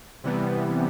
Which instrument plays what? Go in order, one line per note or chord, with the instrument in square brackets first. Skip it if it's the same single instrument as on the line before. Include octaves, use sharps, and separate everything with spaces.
[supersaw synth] C3 E3 G3 B3